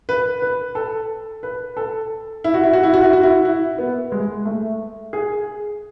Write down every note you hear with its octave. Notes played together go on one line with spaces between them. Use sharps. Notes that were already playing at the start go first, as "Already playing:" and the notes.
B4
B4
A4
B4
A4
E4
F#4
E4
F#4
E4
F#4
E4
F#4
E4
E4
B3
G#3
A3
G#4